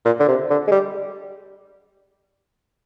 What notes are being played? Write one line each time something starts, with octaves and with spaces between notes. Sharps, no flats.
A#2
D3
C3
D3
G#3
G3